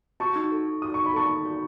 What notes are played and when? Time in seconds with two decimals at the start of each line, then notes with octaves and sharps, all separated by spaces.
0.20 F#4 A5 C#6
0.36 D#4
0.52 A4
0.66 D#4
0.82 F#4 D#6
0.94 D#4 C#6
1.06 B5
1.13 A4 A5 C#6
1.29 D#4
1.45 F#4